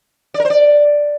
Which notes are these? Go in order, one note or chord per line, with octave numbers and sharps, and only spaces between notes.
D5
A#4
C5
D5